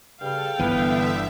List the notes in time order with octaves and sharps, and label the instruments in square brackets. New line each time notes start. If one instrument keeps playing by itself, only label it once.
[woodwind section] G2 C#3 F6 [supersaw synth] A4 [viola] F5 G5
[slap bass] G1 E3 [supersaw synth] D3 E5 [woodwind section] B3